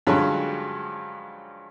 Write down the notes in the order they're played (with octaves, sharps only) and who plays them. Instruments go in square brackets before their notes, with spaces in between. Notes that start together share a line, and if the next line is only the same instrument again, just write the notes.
[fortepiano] G2 D3 F3 F#3 G#3 C#4